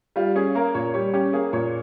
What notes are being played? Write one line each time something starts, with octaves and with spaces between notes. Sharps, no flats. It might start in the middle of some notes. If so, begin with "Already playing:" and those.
G3 F4
C#4 G#4
A#3 A#4
A#2 C#5
G3 C#5
C#4 G4
A#3 G#4
A#2 C#5